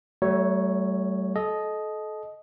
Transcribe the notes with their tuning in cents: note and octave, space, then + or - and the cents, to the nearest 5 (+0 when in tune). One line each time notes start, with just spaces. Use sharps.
F#3 +45 A3 +0 C#5 +0
A4 -30 D#5 +0